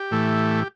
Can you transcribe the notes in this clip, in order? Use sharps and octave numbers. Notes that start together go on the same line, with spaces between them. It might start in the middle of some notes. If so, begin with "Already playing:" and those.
Already playing: G4
A2 E3 A3